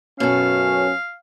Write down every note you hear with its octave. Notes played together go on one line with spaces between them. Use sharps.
F#2 B2 C#4 A4 F5